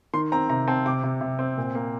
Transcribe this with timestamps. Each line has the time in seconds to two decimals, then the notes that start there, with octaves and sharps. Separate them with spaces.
0.13 D#3 C6
0.32 C4 A#5
0.50 C3 A#5
0.67 C4 A5
0.86 C3 D6
1.04 C3
1.21 C3
1.39 C4
1.58 A#2
1.75 A#3